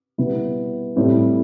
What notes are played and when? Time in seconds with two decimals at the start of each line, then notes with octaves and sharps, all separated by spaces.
0.18 B2 G3 B3 E4
0.96 A2 G3 C4 E4